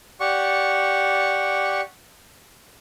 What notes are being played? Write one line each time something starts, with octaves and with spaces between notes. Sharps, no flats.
G4 D5 F#5 C#6